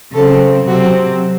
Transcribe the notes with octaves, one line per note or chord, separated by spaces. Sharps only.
C#3 F#3 C4 A4
C3 F#3 C4 F#4